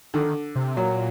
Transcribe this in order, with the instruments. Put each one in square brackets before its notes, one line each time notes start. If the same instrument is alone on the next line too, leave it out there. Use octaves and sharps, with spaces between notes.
[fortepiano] D3 [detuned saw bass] D#3
[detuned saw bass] C3
[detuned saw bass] A#2 [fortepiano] F#3